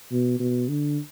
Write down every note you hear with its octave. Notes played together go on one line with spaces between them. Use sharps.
B2
B2
D3